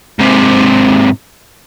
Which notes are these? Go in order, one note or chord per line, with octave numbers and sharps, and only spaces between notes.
G#2 C3